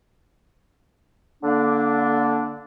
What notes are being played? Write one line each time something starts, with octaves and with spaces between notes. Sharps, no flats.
D3 A#3 D4